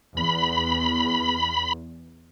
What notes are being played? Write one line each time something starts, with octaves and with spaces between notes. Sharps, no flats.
E2 B5